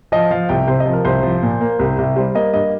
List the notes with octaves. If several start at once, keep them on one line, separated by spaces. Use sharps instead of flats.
F3 D#5
F3 F5
C2 G5
C3 C5
D#5
F3
A#4
C2 C5
F3
A#2
A#3
C2
C2
G3 C5
A#3 D#5
G2 D#5